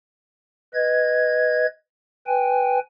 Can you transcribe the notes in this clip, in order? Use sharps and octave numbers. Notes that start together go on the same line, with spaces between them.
B4 D#5 G#6
B4 G5 G#5